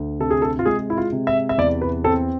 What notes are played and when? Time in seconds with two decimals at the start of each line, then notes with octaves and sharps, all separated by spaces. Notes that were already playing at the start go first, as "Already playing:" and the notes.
Already playing: D2
0.20 C3 A4
0.30 G#4
0.42 A4
0.59 F4
0.66 G#3 G#4
0.90 E4
0.97 F4
1.12 C3
1.27 E5
1.49 E5
1.58 E2 D5
1.82 B4
2.04 C4 A4